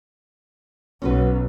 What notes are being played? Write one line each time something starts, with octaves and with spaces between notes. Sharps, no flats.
B1 C#4 F#4 B4